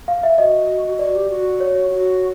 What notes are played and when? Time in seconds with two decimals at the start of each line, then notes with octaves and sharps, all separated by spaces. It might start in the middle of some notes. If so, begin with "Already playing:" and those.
0.08 F5
0.23 E5
0.38 F#4 D#5
0.99 F#4 D5
1.15 G4
1.30 F#4
1.60 C#5
1.90 F#4